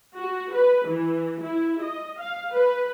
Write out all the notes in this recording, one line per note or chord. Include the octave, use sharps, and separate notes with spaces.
F#4
B4
E3
E4
D#5
F5
B4